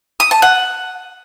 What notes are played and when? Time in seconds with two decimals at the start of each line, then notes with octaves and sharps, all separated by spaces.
0.20 D#6
0.31 A5
0.42 F#5